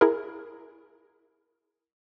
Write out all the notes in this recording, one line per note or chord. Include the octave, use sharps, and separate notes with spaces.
E4 G#4 A#4